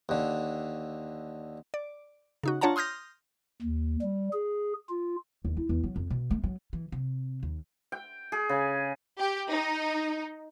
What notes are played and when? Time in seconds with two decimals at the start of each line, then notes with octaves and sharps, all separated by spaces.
0.09 D#2 D3
1.74 D5
2.43 C#3 D#4 F#4
2.61 D4 F4 C#5 F#5 A5 A#5
2.76 C6 D#6 F6 G6 A#6
3.62 D#2
4.02 G3
4.33 G#4
4.89 F4
5.45 D#2
5.57 E4
5.69 E2
5.84 F#3
5.96 F2
6.10 B2
6.31 A3
6.44 F#3
6.73 E3
6.92 C3
7.43 D#2
7.92 G5
8.32 G#4
8.49 C#3
9.19 G4
9.51 D#4